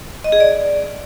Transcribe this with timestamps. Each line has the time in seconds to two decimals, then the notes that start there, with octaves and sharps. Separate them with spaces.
0.24 D#5
0.32 G#4
0.40 D5